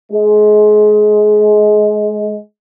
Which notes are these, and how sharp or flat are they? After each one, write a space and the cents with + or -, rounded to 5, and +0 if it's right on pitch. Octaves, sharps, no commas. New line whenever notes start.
G#3 +25